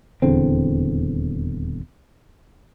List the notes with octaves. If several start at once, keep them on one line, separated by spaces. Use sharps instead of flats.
D#1 E2 D3 C4